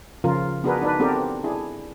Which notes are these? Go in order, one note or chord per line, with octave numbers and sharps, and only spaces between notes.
C#3 F3 C#4 F4 A#4
B3 D4 F#4 G#4 A#4 B4
D4 D#4 B4
B3 C4 D4 G4 A4 A#4
D4 E4 G#4